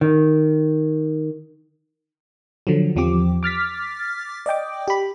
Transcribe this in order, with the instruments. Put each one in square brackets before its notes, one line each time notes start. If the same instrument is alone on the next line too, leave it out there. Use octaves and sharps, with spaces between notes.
[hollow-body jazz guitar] D#3
[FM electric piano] D3 F3 F#3
E2 F3 C4 G4 D6
D6 F6 A6 B6
D5 D#5 G5 D6
G4 B5